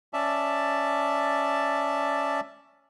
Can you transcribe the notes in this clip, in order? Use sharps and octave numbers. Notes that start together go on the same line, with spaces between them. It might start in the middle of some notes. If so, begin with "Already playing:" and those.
C#4 D5 E5 A5